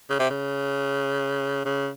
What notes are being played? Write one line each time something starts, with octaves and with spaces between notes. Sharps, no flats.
C#3
C3
C#3
C#3